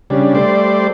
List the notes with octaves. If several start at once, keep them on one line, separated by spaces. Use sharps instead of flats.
C#3 G3 D4
G3 A3 C5 D5